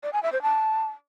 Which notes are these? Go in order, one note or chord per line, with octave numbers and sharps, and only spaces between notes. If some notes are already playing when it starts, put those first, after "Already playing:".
D5
G#5
E5
C5
A5